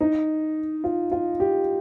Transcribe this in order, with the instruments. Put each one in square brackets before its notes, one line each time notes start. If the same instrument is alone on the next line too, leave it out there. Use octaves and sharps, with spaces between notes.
[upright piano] D#4
F4
F4
G4